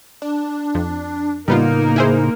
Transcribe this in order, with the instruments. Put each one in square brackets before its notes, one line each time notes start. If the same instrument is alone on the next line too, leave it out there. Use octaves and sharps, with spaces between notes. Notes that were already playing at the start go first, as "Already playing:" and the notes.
[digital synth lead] D4
[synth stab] F2
[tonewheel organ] A2 C#3 [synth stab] G3 B3 F4 [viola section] A#3 A#4 [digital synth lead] D#4
[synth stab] E4 G#4 C5